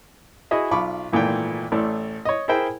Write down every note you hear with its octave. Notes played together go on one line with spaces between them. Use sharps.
E4 F#4 G#4 D#5 E5
B1 F4 B5 C#6 D6
G#1 A#2 E3 A3 F4 G5
A1 A3 D5
C#5 D#5
E4 G#4 A#4 C5 E5 G5